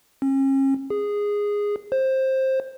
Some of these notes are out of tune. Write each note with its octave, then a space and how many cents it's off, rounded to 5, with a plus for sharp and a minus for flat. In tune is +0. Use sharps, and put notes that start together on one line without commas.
C#4 -40
G#4 -10
C5 +15